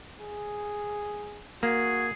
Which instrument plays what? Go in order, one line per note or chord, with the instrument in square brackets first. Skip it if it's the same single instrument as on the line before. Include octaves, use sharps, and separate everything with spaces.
[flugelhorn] G#4
[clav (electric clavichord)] A#3 [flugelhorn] F#4 [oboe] G#4